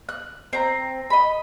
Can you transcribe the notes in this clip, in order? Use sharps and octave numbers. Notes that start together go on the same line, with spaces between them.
F#6
C4 A#5
D#5 B5